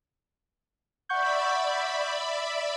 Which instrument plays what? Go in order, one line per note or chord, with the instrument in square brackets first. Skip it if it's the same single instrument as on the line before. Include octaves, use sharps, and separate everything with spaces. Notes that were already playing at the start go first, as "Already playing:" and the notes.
[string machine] D5 E5 B5 [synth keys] F#5 C#6 G6